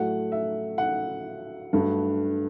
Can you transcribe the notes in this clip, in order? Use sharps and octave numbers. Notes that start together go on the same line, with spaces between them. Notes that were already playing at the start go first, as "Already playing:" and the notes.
Already playing: A2 F#3 A3 F#5
E5
F#5
G2 F#3 A3